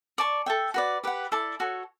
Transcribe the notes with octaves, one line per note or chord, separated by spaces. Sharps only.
D5 A5 C#6
A4 E5 G5
F#4 B4 D5
G4 B4 F#5
E4 A4 D5 A5
F#4 A4 C#5